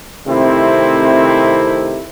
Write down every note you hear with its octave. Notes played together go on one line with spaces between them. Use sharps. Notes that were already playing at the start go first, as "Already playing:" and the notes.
C3 D#3 A3 C4 E4